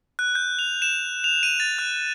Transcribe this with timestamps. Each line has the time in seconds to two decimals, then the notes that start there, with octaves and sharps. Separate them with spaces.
0.19 F#6
0.35 G6
0.59 F7
0.82 E7
1.24 F7
1.43 D#7
1.60 A6
1.79 F#6